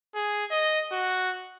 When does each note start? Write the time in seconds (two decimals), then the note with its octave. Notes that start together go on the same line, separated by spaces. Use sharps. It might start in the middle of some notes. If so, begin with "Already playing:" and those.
0.15 G#4
0.51 D#5
0.92 F#4